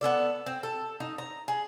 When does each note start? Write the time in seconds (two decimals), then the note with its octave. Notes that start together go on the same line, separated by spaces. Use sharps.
0.01 B3 C#4 A4 D5
0.46 C4
0.63 A4
1.00 D#4
1.18 A#5
1.48 G#4